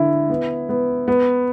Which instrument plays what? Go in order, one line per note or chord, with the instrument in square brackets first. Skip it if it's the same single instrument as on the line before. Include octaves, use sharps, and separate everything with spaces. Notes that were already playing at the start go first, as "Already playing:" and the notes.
Already playing: [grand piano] D3 E4
B3
B3
B3